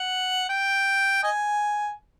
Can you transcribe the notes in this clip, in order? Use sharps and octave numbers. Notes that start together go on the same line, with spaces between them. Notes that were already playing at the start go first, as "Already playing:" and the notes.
Already playing: F#5
G5
D#5 G#5